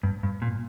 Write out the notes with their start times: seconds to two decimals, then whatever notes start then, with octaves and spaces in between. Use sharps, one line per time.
0.03 G2
0.23 G2
0.42 A#2